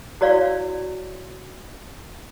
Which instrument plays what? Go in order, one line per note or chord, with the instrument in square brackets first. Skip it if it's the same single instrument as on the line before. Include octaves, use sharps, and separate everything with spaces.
[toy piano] E4 F#4 C#5 D5 F5